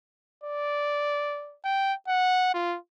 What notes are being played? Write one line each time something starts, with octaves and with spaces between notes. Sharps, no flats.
D5
G5
F#5
F4